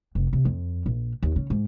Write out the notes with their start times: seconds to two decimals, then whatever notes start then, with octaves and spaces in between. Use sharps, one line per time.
0.15 F1
0.33 C3
0.45 F2
0.86 A#1
1.23 D#2
1.36 C#3
1.50 G#2